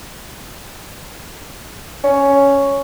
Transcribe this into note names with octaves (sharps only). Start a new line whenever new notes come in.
C#4